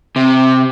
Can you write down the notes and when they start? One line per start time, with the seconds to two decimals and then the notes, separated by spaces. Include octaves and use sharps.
0.16 C3